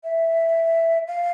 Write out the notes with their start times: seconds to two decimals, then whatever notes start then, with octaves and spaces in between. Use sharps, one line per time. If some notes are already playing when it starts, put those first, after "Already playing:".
0.04 E5
1.08 F5